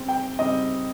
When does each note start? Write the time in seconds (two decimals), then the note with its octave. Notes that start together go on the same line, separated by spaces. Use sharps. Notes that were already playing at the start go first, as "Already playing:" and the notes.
Already playing: C#3 G3 C4
0.09 G5
0.39 C#3 G3 C4 D#5